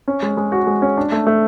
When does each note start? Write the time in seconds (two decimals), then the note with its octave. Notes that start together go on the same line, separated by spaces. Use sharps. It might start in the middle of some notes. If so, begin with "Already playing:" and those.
0.08 C#4
0.22 G#3
0.37 G#3
0.52 F#4
0.67 G#3
0.82 C#4
0.97 D4
1.12 A3
1.27 A3